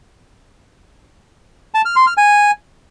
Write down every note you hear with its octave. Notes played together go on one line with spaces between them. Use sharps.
A5
F6
C6
F6
G#5